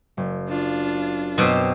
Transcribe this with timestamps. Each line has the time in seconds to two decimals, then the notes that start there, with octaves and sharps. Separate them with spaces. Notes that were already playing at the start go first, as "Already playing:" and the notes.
0.17 F#1
0.49 D4 F4
1.38 F#2 B2 F#3 C4 G4